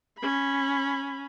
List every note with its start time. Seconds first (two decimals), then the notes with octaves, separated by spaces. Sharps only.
0.18 C#4 B5